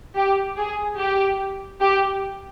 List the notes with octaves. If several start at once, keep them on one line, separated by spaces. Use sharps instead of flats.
G4
G#4
G4
G4